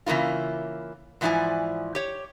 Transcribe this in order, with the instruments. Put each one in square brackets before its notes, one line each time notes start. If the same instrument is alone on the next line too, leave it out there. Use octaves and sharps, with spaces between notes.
[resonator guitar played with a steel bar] C#3 E3 A#3 E4 F4
G#2 E3 F3 E4 D5 G#5
G4 C#5